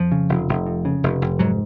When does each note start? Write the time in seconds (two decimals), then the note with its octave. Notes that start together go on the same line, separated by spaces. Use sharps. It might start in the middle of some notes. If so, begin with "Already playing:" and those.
Already playing: F2 F3
0.12 C#3
0.29 F1
0.49 F1
0.66 F2
0.85 C#3
1.04 F1
1.22 F1
1.39 G#2 F#3